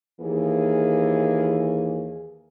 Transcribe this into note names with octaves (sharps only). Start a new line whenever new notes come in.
D#2 E3 A#3 G#4